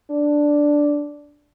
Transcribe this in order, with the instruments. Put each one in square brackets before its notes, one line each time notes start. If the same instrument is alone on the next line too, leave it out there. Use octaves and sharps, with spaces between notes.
[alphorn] D4